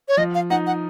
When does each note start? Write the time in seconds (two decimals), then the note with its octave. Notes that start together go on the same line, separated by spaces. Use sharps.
0.08 C#5
0.17 F3 D#5
0.35 F5
0.50 D#4 F#5
0.67 F#5